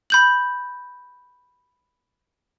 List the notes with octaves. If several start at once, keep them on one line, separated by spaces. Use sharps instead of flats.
B5 G6 F#7